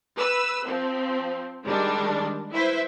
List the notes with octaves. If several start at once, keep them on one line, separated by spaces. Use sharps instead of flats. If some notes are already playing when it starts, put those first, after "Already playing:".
B4 E6
F3 C4
D#3 G3 G#3 D4
E4 B4 C5 E5